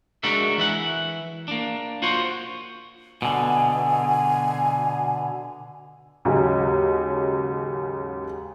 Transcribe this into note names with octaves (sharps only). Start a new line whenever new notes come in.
G#3 D4 F#4 A4 A#4 E5
E3 E5 F#5
A#3 D4
F4 F#4 C5 C#5
B2 D3 G#5
D#2 G#2 C#3 F#3 C#4